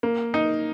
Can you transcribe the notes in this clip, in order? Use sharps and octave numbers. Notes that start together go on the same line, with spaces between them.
A#3
D#4